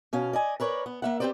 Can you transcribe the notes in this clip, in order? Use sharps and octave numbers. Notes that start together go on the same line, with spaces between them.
B2 C#4 F5
D5 D#5 G#5
A#4 B4 C#5 D5
B3
A#3 E5 F#5
C4 G4 G#4 B4 C5 D5